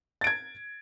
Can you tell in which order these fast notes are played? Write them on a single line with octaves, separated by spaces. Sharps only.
A6 D7 G#6